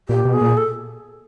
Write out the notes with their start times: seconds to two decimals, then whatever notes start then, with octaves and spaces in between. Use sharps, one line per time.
0.09 A#2 G4
0.25 B2
0.33 G#4
0.41 A#2
0.57 A4